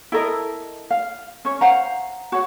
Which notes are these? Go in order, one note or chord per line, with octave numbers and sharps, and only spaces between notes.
E4 A4 A#4 D#5
F5
C#4 C#5
C5 F5 F#5 A#5
F#4 C#5 F#5